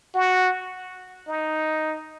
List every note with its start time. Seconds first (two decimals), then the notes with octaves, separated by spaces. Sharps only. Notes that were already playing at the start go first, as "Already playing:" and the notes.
0.14 F#4
1.28 D#4